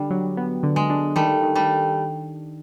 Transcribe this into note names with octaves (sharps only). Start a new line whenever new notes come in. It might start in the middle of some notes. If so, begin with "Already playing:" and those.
Already playing: D3 G3 D4
F#3
B3
D3
G#3
D4
D#3 G3 A3
D#3
G3 A3